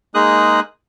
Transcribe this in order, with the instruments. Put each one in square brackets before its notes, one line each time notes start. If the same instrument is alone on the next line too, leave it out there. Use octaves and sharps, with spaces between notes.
[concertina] G#3 A#3 D#4 G#4 D#6 F#6